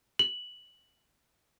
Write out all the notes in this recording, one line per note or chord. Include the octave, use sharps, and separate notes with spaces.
F#7